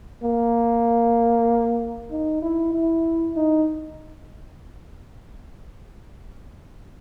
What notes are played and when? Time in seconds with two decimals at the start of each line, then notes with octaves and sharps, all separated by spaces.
0.23 A#3
2.11 D#4
2.42 E4
2.73 E4
3.36 D#4